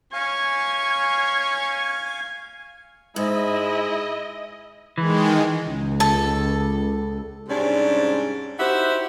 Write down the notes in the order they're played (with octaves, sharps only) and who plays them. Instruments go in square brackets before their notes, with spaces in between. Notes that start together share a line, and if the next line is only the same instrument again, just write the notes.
[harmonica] C#4 C#6 [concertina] F5 G#5 [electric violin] G#6
[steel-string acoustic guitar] G#2 [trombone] G#3 [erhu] E4 [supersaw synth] D#5
[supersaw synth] D#3 G#3 [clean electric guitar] E3
[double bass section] C#2
[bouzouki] A4
[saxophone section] G#2 C3 G3 C#4 D4
D#4 E4 F#4 G4 C5